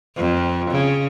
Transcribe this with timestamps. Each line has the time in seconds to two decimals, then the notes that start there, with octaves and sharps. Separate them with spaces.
0.16 F2
0.71 C#3